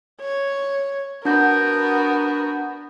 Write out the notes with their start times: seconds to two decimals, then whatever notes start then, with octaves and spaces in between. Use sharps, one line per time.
0.21 C#5
1.25 B3 D4 F#4 A#4 G6 A#6